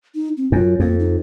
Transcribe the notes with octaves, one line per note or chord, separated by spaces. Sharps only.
D#4
C4
F#2 F4
F2 A#3
D#4